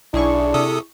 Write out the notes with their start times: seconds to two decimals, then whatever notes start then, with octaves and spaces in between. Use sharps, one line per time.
0.14 B1 D4 E4 G#4 C#6
0.54 C3 A4 D#6